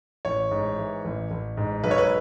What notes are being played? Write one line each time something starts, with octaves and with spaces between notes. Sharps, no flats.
A1 C#5
G#2
E3
A1
A1
G#2
B1 B4
C#5
B4